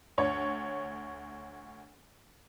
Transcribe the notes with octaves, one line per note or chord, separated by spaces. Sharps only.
D2 C#5